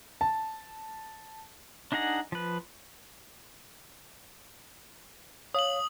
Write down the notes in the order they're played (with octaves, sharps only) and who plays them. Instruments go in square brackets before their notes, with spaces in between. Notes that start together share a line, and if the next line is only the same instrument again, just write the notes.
[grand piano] A5
[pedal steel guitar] D4 D#4 G#4 F#5 A#5
F3 B4
[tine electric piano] C#5 F5 [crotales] D#6 F#7